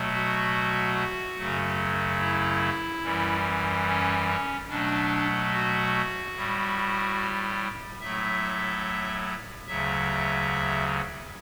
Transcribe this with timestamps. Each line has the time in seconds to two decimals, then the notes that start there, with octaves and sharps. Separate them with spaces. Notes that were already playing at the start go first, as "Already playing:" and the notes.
Already playing: B2 F#3 A3
0.12 F#4
1.37 F#2 C#3 F#3 A3
2.20 E4
3.03 F#2 E3 G3
3.86 C#4
4.28 C#4
4.69 B2 F#3 A3 D4
5.52 F#4
6.35 A2 G3
8.01 A2 F#3 A3 E5
9.67 D2 C#3 F#3 E5